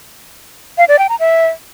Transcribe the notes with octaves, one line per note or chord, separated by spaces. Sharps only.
F5
D5
G5
A#5
E5